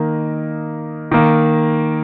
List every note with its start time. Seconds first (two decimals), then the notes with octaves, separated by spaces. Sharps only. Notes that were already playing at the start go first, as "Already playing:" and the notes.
Already playing: D#3 A#3 D#5
1.11 D#3 A#3